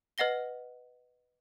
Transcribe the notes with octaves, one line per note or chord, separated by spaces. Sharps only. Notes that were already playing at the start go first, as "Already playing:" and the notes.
B4 D#5 F#5 A#6 G7